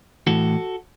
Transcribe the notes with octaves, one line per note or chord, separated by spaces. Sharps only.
A2 E3 F#4 A4